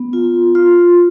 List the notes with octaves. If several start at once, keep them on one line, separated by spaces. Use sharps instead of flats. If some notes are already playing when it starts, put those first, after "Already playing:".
Already playing: B3
F4
F4